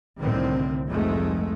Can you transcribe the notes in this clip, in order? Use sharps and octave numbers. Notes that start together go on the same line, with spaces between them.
C2 A2 D3 D#3 C4
F1 C2 F2 G#2 G#3 A3